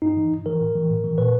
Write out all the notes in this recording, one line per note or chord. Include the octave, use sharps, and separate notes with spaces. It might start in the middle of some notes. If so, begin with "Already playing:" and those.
G2 D#4
E3
G2
E3 A#4
A2
E3
A2
E3
A#2 B4